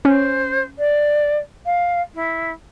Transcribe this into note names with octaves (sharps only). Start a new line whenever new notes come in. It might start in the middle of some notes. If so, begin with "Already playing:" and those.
C#4 C5
D5
F5
E4